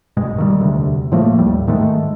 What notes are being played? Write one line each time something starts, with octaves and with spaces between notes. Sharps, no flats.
A#1 G2 B2 G#3
D#3 E3 G3
E1 D2 C3
A2 F3 A3 A#3
G#1 D#2 A2 G3
G#2 D#3 G#3 A3